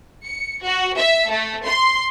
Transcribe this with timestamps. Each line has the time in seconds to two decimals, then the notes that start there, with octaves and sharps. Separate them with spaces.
0.25 C#7
0.64 F#4
0.97 E5
1.29 A3
1.66 C6